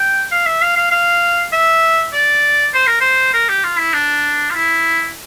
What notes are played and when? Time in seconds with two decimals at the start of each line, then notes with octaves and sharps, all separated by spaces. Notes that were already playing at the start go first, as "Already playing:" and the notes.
Already playing: G5
0.31 F5
0.46 E5
0.62 F5
0.76 F5
0.91 F5
1.53 E5
2.13 D5
2.74 C5
2.87 A#4
3.01 C5
3.33 A#4
3.49 G4
3.64 F4
3.78 E4
3.93 D4
4.51 F4
4.55 E4